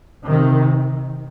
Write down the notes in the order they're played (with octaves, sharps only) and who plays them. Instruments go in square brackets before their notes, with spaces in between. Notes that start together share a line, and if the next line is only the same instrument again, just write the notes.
[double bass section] C3 D#3